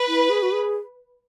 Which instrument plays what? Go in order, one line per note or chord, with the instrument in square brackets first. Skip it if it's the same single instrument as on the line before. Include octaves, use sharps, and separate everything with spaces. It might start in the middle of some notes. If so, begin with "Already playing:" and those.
Already playing: [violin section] B4
[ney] E4
G#4
F#4
G#4